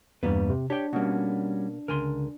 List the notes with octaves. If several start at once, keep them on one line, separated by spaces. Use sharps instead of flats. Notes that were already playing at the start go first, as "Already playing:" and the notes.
E2 G2 G3 A#3 B4
C3
D4 G4 C#5 G5
B2 G3 A#3 C#4 F#4
C#2 D3 A#4 G#5 C6